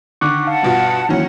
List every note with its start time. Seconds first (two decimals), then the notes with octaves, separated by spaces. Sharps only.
0.21 D3 D#3 C#6 D6 F#6
0.47 F5 F#5 A5
0.63 G2 B2 F4
1.09 D#3 E3 F#3 A#3 C#4 E4 F#5